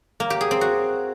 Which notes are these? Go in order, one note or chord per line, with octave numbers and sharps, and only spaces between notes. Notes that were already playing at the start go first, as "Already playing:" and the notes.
A#3
G4
G#4
C4
F#4